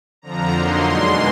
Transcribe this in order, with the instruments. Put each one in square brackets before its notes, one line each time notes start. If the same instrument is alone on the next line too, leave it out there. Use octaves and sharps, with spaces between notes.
[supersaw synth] F2 D3 F3 A#5
D3 F#3 A#3 D#4 C6
E2 B2 G#3